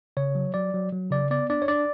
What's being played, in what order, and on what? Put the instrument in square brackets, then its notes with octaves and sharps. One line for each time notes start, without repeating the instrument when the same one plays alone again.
[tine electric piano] C#3 C#5
F#3
F#3 D5
F#3
F#3
C#3 D5
B3 D5
D4 D5
C#5
D4 D5